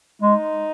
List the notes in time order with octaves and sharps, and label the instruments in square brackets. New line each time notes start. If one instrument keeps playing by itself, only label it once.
[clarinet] G#3 [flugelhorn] D#4